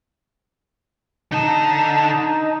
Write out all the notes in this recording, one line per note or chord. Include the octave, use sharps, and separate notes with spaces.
D3 D#4 A5